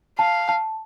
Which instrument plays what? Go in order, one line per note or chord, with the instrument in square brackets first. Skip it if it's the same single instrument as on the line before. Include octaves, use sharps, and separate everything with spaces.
[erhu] F5 [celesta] A5
[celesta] A5